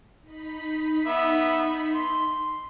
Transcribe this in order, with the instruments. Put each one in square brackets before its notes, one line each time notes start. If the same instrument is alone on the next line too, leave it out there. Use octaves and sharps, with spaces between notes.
[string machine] D#4 B5 B6
[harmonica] B3 E5
C6